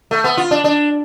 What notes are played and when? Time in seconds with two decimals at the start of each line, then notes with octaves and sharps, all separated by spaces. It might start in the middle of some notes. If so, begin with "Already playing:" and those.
0.11 A3
0.24 B3
0.38 F4
0.51 D4
0.64 D4